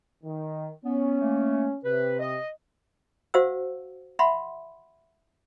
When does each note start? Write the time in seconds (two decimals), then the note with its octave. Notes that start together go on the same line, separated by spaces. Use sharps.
0.24 D#3
0.85 B3 C#4
1.21 A3 A#3
1.85 C3 B4
2.19 D#5
3.34 F#4 C5 F5 F#5 E6
4.19 E5 F#5 B5 C6